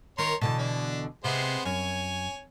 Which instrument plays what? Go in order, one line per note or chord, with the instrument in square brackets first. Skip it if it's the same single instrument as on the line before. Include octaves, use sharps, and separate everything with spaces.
[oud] D#3 A#4 [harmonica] C#5 A#5 C6
[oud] B2 D3 E3 [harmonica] A5
[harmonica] D4
[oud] C3 [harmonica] G#3 B3 C5
[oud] F#2 [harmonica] C#5 G#5